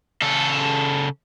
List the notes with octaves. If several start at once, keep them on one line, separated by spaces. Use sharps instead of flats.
C#3 A4